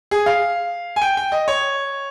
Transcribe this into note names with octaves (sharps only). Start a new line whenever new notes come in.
G#4
F5
G#5
G5
G5
D#5
C#5